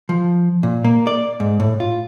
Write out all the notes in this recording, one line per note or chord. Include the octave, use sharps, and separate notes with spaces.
F3
A#2
A#3
D5
G#2
A2
F4